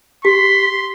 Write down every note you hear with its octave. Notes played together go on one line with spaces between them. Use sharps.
G4 C6 B6